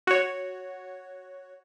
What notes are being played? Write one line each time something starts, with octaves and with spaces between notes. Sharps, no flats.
F#4 C#5